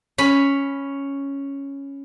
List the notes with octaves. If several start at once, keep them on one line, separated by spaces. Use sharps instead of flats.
C#4 B5